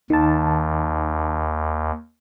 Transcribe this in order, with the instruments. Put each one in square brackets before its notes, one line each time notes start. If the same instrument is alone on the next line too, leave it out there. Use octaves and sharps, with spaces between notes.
[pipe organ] D#2 [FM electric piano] D#3 A5